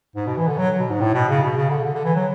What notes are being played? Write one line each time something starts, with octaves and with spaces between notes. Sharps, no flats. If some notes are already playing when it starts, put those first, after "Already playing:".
G#2
B2
E3
D3
F#3
B2
G#2
A2
B2
C#3
B2
C#3
D3
D3
D3
E3
F#3